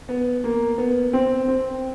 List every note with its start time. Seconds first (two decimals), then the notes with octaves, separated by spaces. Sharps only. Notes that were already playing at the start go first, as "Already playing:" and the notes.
0.09 B3
0.44 A#3
0.78 B3
1.13 C4
1.48 C4